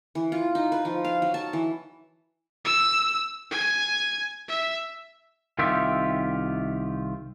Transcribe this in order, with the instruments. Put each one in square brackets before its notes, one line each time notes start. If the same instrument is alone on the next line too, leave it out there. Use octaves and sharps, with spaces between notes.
[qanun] E3
F4
D#4
B4
F3
F5
F#3
A5
E3
[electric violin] E6
G#5
E5
[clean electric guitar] C2 D#3 F4 G4 E5